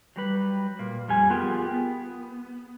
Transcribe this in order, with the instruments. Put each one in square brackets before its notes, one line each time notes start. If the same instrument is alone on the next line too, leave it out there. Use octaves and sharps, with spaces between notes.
[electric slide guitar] F#3 G3 B4
A#2 A#3
F2 G3 G#5
B3 F4 G4 G#4 A#4
B3